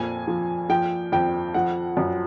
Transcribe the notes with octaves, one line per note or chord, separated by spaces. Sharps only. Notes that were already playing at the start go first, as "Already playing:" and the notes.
Already playing: F2 A#2 G#5
F3
F3 G5
F2 G5
F3 F#5
F#2